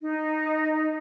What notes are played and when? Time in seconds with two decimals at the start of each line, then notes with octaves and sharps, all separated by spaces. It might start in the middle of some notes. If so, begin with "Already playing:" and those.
0.01 D#4